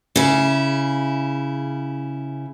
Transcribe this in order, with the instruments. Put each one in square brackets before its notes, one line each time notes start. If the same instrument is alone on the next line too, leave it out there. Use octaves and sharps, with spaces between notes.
[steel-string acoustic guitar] C#3 E4